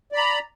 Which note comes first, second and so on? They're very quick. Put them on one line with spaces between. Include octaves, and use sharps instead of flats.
D5 B5 A#5